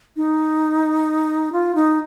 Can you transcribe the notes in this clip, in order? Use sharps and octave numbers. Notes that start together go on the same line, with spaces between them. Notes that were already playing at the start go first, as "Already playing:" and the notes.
D#4
F4
D#4